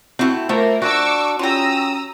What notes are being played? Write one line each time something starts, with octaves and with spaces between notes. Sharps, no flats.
A3 C4 E4 F#4
F3 A3 A#3 A#4 C5 E5
D4 F#4 C#6 D6 E6
C#4 F4 G4 A#5 D#6 E6